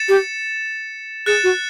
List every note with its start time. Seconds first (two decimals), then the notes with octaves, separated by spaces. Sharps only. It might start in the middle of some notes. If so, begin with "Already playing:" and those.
Already playing: A6 C#7 E7
0.09 G4
1.26 G#4 F#6 A6 C#7 E7
1.44 F#4